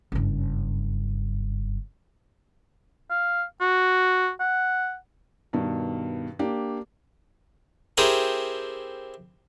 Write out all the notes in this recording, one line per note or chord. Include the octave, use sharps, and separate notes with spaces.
F#1 G2
F5
F#4
F#5
G2 B2 D#3
A#3 D4 G4
C4 E4 G4 G#4 A#4